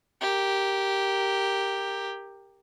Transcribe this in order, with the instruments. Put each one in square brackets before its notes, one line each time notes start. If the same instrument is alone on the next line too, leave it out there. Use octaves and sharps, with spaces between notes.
[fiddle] G4 A#4